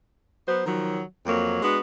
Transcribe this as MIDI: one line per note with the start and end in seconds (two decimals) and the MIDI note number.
0.48 0.61 54
0.48 0.61 59
0.48 0.61 66
0.48 0.61 72
0.65 1.02 51
0.65 1.02 53
0.65 1.02 54
1.26 1.59 41
1.26 1.59 54
1.26 1.59 58
1.62 1.79 56
1.62 1.79 59
1.62 1.79 62
1.62 1.79 66